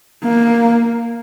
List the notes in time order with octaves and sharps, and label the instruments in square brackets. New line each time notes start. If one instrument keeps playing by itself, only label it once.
[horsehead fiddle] A#3